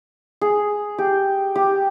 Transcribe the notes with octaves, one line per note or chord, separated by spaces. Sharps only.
G#4
G4
G4